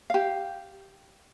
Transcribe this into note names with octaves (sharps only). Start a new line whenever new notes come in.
G4 F5